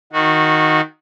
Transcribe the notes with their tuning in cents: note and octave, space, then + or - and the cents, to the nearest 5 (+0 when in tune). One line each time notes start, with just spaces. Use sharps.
D#3 +0 F#4 -20